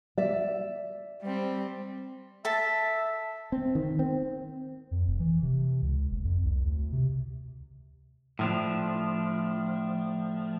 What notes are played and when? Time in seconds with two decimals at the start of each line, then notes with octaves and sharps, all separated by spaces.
0.18 D5 E5
1.23 G3 C4
2.45 A4 E5 A5
3.52 C4
3.75 D#3
3.99 C4
4.91 F2
5.07 F1
5.19 E3
5.42 C3
5.82 C#2
6.11 F#1
6.24 F2
6.43 C2
6.64 D2
6.92 C3
8.39 A2 F3 D4